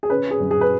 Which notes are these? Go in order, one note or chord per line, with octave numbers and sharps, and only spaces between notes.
G#4
C#4 B4
G#4
F#2
G#4
B4